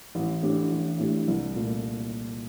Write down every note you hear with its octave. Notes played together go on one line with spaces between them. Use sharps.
A1
A2 A3 D4 G4
A1
A2 A3 D4 G4
C2
A#2 A3